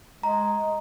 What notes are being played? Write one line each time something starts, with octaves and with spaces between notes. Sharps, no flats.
G#3 A#5